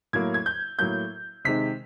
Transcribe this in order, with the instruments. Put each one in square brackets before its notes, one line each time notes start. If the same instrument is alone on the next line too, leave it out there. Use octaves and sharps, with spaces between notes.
[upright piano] A2 F#3 A#3 G#6
G#6
G6
A2 F#3 A#3 G6
C3 D#3 G#3 B6